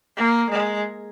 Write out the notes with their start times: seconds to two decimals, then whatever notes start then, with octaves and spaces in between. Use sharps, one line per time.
0.17 A#3
0.50 G#3